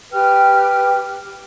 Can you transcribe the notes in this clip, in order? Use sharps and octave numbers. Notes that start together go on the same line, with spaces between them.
G4 B4 G5 F6